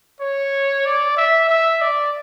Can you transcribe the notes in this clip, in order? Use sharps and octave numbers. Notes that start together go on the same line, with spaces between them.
C#5
D5
E5
E5
D5